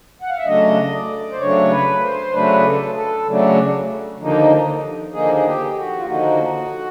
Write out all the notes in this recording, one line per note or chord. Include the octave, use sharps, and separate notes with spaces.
F#5
F5
E5
C#3 F#3 A3 D4 D#5
D5
C5
C#3 F#3 A3 D4 C#5
B4
C5
C#3 F#3 A3 D4 B4
G#4
A4
A4
C#3 F#3 A3 D4
D#2 D3 F3 A#3 D#4
D#2 D3 F3 A#3 D#4 G#4
G#4
G4
F#4
F4
D#2 D3 F3 A#3 D#4 F#4